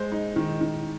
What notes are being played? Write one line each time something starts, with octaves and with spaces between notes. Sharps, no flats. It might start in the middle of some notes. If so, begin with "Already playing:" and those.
Already playing: G#3 C5
D#4
D#3
D#3